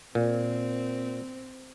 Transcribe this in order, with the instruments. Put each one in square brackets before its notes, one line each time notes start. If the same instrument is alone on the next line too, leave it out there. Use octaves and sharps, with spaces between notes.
[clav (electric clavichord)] A#2 [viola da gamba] C4